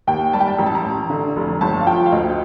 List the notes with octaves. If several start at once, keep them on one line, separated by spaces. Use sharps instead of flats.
D#2 G5
G3 A5
G5
A5
A1 A#5
A5
A#5
A1
D3
F1
G1 A5
F5
F3 G5
F5
D2 D#5